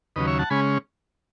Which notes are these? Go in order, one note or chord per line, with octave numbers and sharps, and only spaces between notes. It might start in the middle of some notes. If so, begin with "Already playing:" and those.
D#2 C#3 F#3 B4 D#5
C#5 E5
F#5 A5
C#3 G#3 C#4 G#5 B5